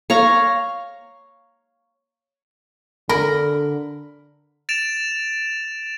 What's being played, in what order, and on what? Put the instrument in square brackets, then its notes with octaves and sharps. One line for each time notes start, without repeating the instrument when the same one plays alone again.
[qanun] C#5 F5 A#5
[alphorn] D3 [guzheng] A#4 [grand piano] B5
[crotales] A6 D7 E7 F7